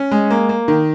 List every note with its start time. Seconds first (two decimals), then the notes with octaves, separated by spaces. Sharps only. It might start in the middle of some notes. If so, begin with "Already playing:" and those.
Already playing: C#4
0.11 G#3
0.30 A#3
0.49 A#3
0.68 D#3